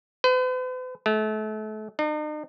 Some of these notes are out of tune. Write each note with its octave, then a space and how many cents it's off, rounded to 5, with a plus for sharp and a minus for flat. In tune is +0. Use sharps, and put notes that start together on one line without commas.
B4 +45
A3 -35
D#4 -45